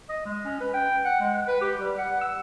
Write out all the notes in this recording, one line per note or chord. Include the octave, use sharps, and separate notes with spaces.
D#5
G#3
C#4
B4
G5
F#5
G#3
B4
G4
G3
F#5
E6